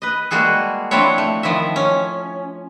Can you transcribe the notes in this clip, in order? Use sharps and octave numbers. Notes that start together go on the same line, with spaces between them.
B4 D#5
G3 G#3 A#3 F#4 G#4 A4
F3 C4 D4 E4 C#5
A3
D#3 F3 E4 D#5 E5
C#4